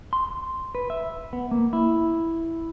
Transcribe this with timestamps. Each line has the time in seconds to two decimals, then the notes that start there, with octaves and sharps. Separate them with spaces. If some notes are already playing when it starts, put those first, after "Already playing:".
0.13 C6
0.75 B4
0.90 E5
1.33 B3
1.51 A#3
1.73 E4